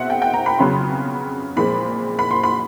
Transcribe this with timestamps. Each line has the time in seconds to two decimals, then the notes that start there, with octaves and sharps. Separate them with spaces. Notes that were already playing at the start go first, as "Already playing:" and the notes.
Already playing: B2 G#3 C4 E5 F#5
0.10 G5
0.22 G5
0.34 A#5
0.46 B5
0.58 F2 C#3 F#3 B3 C6
1.56 A#2 F3 G#3 C4 B5
2.19 B5
2.31 C6
2.43 B5